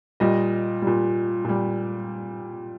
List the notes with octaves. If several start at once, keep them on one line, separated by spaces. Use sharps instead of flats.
A#2 G3 D#5
A#2 G3
A#2 G3